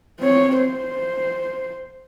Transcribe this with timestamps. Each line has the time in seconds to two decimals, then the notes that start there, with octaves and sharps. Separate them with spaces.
0.20 C4 C#5
0.58 C5